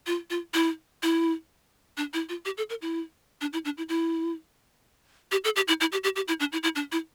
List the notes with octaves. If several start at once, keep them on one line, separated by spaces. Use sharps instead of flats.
F4
F4
E4
E4
D4
E4
F4
G4
A4
A#4
E4
D4
E4
D4
E4
E4
G4
A4
G4
E4
E4
G4
G4
G4
E4
D4
E4
E4
D4
E4